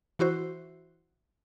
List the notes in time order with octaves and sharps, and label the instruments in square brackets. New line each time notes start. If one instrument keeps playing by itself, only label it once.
[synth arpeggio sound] E3 E4 F#4 C5